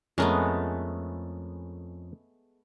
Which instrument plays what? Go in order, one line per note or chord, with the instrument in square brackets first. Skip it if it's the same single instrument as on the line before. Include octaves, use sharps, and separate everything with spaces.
[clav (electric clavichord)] F2 C#4 A#4 [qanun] G#3 A3 B3